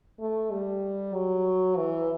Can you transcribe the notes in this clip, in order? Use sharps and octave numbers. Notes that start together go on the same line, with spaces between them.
A3
G3
F#3
E3